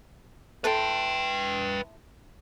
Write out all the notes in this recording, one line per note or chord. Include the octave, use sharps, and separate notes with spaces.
E4 A4 B4 G5 C6